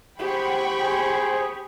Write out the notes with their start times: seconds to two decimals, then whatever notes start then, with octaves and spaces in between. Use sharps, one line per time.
0.19 G4 G#4 C5 F#5 G5 B5 C#6
0.80 G#4 C5